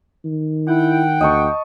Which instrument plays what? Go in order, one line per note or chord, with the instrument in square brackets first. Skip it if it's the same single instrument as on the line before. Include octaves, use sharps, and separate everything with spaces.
[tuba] D#3
[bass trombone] E4 [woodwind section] F#5 G5
[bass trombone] D2 [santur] D#5 A5 C#6